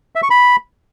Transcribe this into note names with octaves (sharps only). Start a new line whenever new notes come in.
E5
C#6
B5